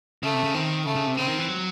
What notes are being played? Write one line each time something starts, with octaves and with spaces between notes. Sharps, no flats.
C#3 A3
C3
C#3
D#3 C4
C#3 A3
C#3
C3
C#3 C4
D#3
E3
F#3